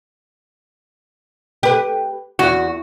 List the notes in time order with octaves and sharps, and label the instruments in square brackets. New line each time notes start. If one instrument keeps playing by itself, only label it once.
[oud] G4 B4
[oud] E2 [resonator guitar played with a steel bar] F#4